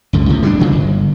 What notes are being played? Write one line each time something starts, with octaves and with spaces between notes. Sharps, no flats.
C#2 F#2 D3
A2 C3
G3 G#3 C4 D4
C#3 F#3
G1